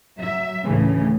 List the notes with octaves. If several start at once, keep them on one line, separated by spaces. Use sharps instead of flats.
F#3 E5
D2 A2 C#3 E3